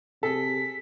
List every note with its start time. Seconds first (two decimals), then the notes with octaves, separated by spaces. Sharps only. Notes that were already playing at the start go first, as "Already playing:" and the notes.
0.23 C3 G#4 A4 B6